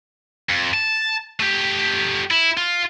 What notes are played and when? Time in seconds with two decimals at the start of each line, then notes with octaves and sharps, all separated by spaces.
0.49 F2
0.74 A5
1.40 A3 G4
2.31 E4
2.57 F4